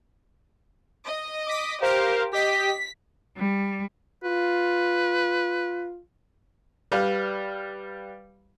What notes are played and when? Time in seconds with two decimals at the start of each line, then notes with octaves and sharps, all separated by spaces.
1.07 D#5
1.46 D6 D#6 B6
1.82 G4 A#4 C5 F5
2.33 G4 D#5 B6
3.37 G3
4.24 F4 B4
6.92 G3 B4 F5